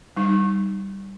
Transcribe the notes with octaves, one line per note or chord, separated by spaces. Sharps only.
G3 D#4